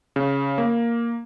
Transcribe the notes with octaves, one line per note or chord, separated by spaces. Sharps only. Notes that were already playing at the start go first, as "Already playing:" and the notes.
C#3
A#3